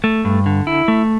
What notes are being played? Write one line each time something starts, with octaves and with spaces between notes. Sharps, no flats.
A3
G2
D3
E4
A3